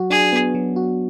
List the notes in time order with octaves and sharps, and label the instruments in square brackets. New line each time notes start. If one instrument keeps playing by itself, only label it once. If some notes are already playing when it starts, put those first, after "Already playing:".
Already playing: [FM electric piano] F#3 F#4
[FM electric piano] D4 [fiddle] G#4
[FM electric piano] B3
F#3
F#4